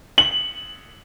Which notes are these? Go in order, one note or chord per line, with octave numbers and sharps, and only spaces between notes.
F#7